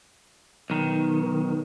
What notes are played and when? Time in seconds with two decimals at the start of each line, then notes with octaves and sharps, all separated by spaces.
0.70 B1 D#3